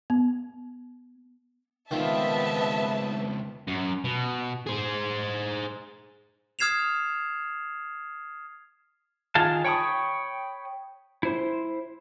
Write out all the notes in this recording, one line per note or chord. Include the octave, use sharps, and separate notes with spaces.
B3
C#2 D#3 B3 C4 F4 E5 A5
F#2
B2
G#4 C5
D#6 F6 G#6 C7 E7 F7
D#3 F4 G#4 F5 A5
C#5 G5 B5 C#6 D#6
E4 C5